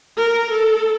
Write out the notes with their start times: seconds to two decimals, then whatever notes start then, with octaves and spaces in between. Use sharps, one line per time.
0.18 A#4
0.52 A4